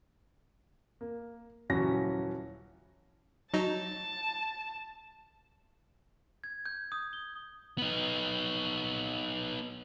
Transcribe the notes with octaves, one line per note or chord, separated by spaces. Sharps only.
A#3
D#1 C#3 E3 F#3 C#4 A#6
F#3 D#4 A5
G#6
G6
D#6
G7
B3 D#4